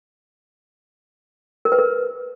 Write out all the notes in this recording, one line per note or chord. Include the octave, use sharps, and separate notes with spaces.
A#4
B4
A#4